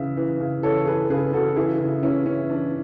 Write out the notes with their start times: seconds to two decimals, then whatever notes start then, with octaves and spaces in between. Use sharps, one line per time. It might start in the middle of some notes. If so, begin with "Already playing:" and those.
Already playing: C#3 E3 E5
0.17 E3
0.40 C#3
0.63 E3 A4 C#5
0.86 E3 G#4 B4
1.10 C#3 G#4 B4
1.33 C#3 F#4 A4
1.56 E3 E4 G#4
1.80 C#3
2.03 E3 C#4 E4
2.26 E3 C#4
2.50 E3 D4